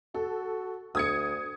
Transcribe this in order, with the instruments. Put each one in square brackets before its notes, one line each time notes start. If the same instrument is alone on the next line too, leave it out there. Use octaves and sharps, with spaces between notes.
[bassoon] F#4 [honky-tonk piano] A4
[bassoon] D2 [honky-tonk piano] D#6 G#6 C#7